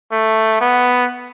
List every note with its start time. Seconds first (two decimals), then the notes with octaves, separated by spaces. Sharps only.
0.12 A3
0.61 B3